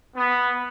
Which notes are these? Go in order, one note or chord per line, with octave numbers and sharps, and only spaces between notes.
B3